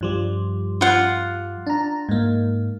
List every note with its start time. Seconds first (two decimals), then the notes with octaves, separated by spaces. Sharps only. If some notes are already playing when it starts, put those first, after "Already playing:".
0.01 G2 F3 G3
0.81 F4 F#5
1.67 D4 A#5
2.09 G#2 A#3